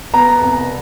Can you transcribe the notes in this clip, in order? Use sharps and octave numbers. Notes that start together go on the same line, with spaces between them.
B3 A#5
C2